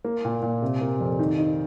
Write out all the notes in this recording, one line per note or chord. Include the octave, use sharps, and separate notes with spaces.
A#3
A#2
A#2
C3
A#3
F2
D#3
D#4